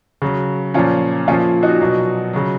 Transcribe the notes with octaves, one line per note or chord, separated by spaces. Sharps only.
C#3 F#3
A#2 F3 C#4 F4
A#2 F3 C#4 F4
D#4 F#4
B2 F#3
C#3 F#3